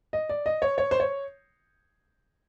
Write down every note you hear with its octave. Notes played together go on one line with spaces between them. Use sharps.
D#5
D5
D#5
C#5
C#5
C5
C#5